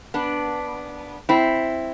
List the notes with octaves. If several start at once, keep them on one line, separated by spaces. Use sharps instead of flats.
B3 D4
C4 E4